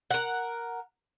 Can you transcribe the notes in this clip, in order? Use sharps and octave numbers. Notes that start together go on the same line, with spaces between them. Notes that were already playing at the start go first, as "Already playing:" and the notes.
A#4 F#5